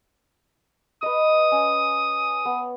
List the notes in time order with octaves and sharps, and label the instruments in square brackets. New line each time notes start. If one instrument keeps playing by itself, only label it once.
[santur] B4 D#5 [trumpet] D#6
[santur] C#4
B3